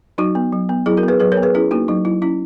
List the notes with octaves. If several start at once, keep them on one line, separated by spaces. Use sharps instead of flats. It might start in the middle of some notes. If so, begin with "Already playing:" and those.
F#3 D#4 F#4
B3
F#3
B3
F#3 E4 G#4
F#4 A#4
B3
G#4 B4
F#3 G#4 B4
A#4 C#5
B3
G#4 B4
C#4 E4 G#4
A#3 D#4 F#4
F#3 D#4
F#3 E4
C#4 E4